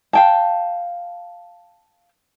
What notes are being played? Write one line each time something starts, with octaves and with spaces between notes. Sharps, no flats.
F5 G5 A5